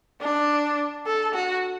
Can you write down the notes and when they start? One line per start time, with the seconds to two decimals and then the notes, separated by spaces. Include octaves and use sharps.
0.21 D4
1.06 A4
1.34 F#4